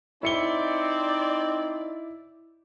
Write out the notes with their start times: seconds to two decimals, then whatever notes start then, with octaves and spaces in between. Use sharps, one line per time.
0.23 C4 D#4 E4 D5 C#7 G7